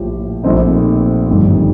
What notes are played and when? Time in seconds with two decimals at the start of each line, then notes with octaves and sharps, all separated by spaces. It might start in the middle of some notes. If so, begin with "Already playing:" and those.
Already playing: A#1 A2 F3 G4
0.44 A#1 A#2 A3 C4 D#4
1.27 G1 F2 D#3 G3